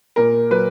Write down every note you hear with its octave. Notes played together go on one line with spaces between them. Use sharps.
A#2 A#4
F#3 B4